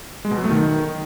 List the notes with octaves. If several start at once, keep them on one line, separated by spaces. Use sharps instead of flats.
G#3
B2
F#3
A3
D#3